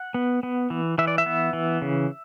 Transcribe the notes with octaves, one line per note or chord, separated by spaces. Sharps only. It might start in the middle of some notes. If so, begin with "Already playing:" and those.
Already playing: F#5
B3
B3
E3
E3 E5
D5
E5
B3
E3
C#3